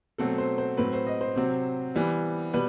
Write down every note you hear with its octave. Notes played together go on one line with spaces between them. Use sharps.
B2 F#3 A3 C4 A4
C5
C5
A2 F#3 C4 B4
C5
D#5
C5
C3 F#3 C4
E3 G3 B3
B2 G3 B4